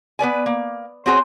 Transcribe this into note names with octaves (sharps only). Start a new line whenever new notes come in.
B3 B4 D5 G#5
A#3
C4 C#4 F#4 G#4 C5 C#5